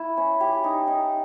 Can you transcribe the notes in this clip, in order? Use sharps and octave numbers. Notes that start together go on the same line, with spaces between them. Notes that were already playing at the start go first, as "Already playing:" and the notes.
Already playing: E4
C#4
G4
D#4
D#4